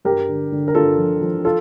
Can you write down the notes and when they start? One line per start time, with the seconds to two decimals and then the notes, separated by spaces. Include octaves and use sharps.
0.05 G2 G4 A#4
0.29 D3
0.52 D3
0.68 A#4
0.75 G2 F4 A4
0.98 F3
1.21 F3
1.45 F4 A4